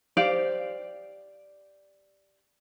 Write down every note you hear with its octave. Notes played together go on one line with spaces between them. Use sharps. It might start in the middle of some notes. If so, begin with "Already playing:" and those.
G4 C5 D5 F5